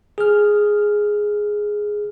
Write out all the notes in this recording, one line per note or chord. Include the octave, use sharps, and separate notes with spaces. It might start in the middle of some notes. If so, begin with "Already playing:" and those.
G#4 F6